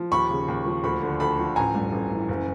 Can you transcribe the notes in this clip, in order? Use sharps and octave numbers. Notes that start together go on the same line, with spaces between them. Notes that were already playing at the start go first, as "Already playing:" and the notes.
Already playing: F3
D#2 B5 C#6
C#3
D#2
F3
D2 B5 C#6
D3
D2 A5 B5
F3
A1 G#5 A#5
G2
A1
E3
F#1